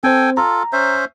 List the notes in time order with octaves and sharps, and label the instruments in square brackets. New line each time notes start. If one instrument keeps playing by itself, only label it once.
[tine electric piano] C4 C5 [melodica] A4 G5 G#5
[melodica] F4 A4 [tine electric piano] A#5
[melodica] C#4 C5 E5